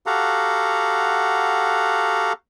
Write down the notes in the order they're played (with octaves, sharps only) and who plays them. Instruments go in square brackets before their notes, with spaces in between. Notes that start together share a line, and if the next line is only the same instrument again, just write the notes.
[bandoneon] F#4 G4 A4 F5 F#5 A#5